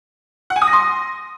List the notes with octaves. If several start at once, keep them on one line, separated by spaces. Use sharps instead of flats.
F#5
G#5
D#6
A#6
C6